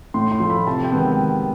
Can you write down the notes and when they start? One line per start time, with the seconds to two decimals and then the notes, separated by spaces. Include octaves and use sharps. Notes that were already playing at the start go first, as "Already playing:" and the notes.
0.14 A2 C6
0.32 C6
0.40 F3 A3
0.50 B5
0.67 C3 A5
0.84 G5
0.92 D#3 G#3 B3